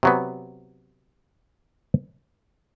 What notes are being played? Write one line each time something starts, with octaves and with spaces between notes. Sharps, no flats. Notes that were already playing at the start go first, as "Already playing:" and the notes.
C3 F#3 B3